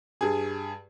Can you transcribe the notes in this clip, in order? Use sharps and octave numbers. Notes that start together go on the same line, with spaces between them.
G2 G#4